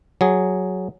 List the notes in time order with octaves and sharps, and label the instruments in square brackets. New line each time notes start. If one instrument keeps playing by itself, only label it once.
[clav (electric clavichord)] F#3 G#4